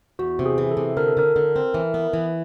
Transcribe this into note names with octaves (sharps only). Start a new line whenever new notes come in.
E2 F#4
C3
G#4
E3
A4
C3
D3 A#4
A4
D3 A#4
D3
C4
E3
B3
E3